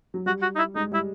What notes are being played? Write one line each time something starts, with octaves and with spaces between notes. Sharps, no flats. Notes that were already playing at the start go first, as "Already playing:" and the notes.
F#3
G3 F#4
F#4
D#4
E4
G#3 D#4
G3 E4